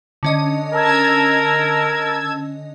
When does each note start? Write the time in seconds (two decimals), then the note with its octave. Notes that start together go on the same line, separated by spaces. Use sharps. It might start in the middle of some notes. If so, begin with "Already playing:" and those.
0.23 D3 C#4 D#5
0.73 A#4 A5 E6 G#6